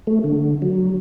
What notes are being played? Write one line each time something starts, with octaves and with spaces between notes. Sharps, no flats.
A3
D3
F#3